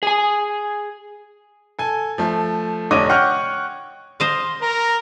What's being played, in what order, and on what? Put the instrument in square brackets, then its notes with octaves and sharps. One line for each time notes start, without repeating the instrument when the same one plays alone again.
[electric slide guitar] G#4 G#5
[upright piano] A4 G#5
F3 A3
F1 D3 C#5 D#5 D6 D#7
C#5 F#5 G5 C#6 F6 G6
[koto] C5 D#5 F5 [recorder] C6
[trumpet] A#4 [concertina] A#5